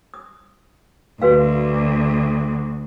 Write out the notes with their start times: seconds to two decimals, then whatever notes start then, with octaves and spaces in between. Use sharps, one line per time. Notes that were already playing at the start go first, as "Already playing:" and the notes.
0.14 D#6
1.22 D2 F#4 B4 F5